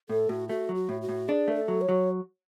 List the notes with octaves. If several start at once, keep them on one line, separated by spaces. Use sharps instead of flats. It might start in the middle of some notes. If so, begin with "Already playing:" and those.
A2 A4
A2 F#4
A3 F#4
F#3
F#4
A2
F#4
A2
D4 G#4
A3 B4
A4
F#3
C#5
F#3